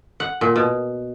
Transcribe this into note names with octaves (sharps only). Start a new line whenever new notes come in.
F#5
A#2
B2